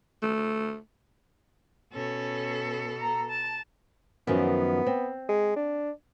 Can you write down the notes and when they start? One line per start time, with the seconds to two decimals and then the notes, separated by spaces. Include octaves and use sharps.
0.22 A3
1.94 B2 C#4 A4
3.01 A#5
3.30 A5
4.27 F#2 D#3 F3 B3
4.86 C4
5.29 G#3
5.56 D4